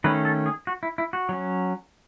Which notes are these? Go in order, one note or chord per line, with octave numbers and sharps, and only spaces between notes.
D#3 A3 C#4 B4
A4
G#4
F#4
E4
E4
F#4
F#3 C#4